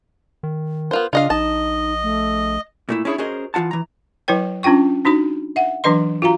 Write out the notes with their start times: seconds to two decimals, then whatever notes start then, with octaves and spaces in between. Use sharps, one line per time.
0.43 D#3
0.91 B3 F4 A#4 C5
1.13 C#3 D4 F4 D#5 F5
1.30 A#1 D#4 D#5 A5
2.03 A3
2.89 A#2 A3 E4
3.05 C#4 D4 E4 G#4 C#5
3.18 C#4 F#4 G#4 A#4 C5 D#5
3.54 E3 A3 F4 F#5 A5
3.71 E3 A#5
4.28 F#3 E4 B4 C#5 G5
4.63 C#4 D4 F4 G5 C#6
5.05 D4 D#4 F#4 B5
5.56 E5 F#5
5.84 E3 F#3 D4 B4 D#5 C6
6.22 F4 F#4 F5 A#5